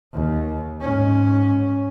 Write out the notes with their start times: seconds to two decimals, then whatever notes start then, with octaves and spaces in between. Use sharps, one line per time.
0.14 D#2
0.82 G#2 C#4